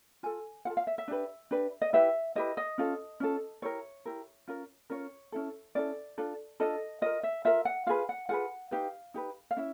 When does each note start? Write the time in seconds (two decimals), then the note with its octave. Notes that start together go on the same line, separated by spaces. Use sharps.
0.23 F4 A4 G#5
0.65 F4 A4 F#5
0.77 F5
0.87 E5
0.98 E5
1.08 D4 G4 B4
1.51 D4 G4 B4
1.82 D#5
1.93 E4 G4 B4 E5
2.35 E4 G4 B4 D#5
2.57 D#5
2.78 C#4 F4 A4
3.20 C#4 F4 A4
3.62 E4 G4 A#4 C#5
4.05 E4 G4 A#4
4.48 C#4 F4 A#4
4.90 C#4 F4 A#4 C#5
5.32 C#4 E4 A4
5.75 C#4 E4 A4 D5
6.18 D4 F4 A4
6.60 D4 F4 A4 D#5
7.02 F4 A#4 D#5
7.23 E5
7.45 F4 A#4 E5
7.65 F#5
7.87 F4 G#4 B4 F5
8.09 F#5
8.29 F4 G#4 B4 F#5
8.71 D#4 G4 B4 F5
9.14 D#4 G4 B4
9.51 F5
9.57 C#4 E4 E5